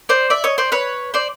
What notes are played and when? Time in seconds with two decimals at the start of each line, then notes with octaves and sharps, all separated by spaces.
0.09 C5 D5
0.30 D5 E5
0.44 C#5 D#5
0.58 C5 D5
0.72 B4 C#5
1.14 C5 D5